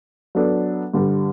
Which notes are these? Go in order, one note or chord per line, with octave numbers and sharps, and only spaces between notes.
F#3 B3 D4 A4
G2 D3 G3